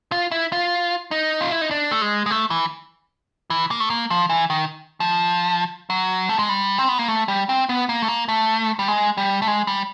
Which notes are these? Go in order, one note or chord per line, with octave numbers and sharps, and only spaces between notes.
F4
E4
F4
D#4
F4
E4
D#4
D4
A3
G#3
G#3
A3
E3
E3
A#3
A3
A#3
F3
E3
D#3
F3
F#3
A3
G#3
G3
C4
B3
A#3
A3
G3
C4
B3
A#3
A3
A#3
A3
G3
G#3
G3
A3
G#3
G3